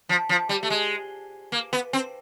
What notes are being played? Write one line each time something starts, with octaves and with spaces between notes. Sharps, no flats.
F3
F3
G3
A3
G#3
A#3
B3
C4